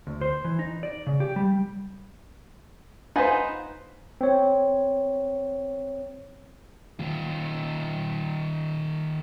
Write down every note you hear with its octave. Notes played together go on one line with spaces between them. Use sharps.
D2
C5
E3
D#4
D5
C#3
G4
G3
D#4 F4 B4 C5 F#5 G#5
C4 C#5
D#3 F4